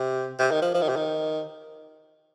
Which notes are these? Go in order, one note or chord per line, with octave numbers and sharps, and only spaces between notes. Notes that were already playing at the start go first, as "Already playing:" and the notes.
Already playing: C3
C3
D#3
F3
F3
D#3
C3
D#3